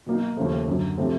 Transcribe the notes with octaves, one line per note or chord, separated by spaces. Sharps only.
B2 F#3 A#3 D#4
D#2 C#3 F3 A3
F#2 D3 F#3
C3 F3 A3 C4